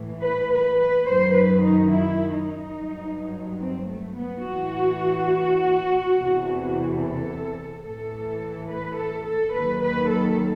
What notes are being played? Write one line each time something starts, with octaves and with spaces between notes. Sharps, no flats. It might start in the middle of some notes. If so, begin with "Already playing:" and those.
Already playing: A2 E3
B4
B4
B4
F#2 D#3 F#3 C5
B4
D#4
E4
D#4
G2 F#3
C4
A3
B3
A2 E3 F#4
E2 C3 E3
A4
A2 E3 A4
B4
A4
A4
D#2 D#3 F#3 B4
B4
A4